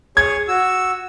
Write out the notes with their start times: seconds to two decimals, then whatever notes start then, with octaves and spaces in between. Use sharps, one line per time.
0.17 G#4 C#5 G#6
0.48 F#4 E6